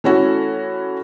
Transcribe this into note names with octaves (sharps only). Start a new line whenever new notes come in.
E3 A3 C#4 E4 F#4 A4